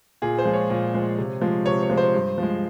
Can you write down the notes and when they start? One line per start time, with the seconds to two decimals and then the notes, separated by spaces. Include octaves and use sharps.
0.22 A#2 G#4
0.39 C5
0.45 F3 G#3
0.53 C#5
0.70 A#2
0.94 F3 G#3
1.18 C3
1.42 F3 G#3
1.66 C3 C#5
1.83 C#5
1.90 F3 G#3
1.97 C5
2.14 G2
2.38 F3 G#3